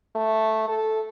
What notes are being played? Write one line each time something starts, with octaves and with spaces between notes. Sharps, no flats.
A3
A4